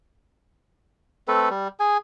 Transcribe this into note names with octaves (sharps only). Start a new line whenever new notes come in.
A3 C4 A4 B4
G3
G#4 G#5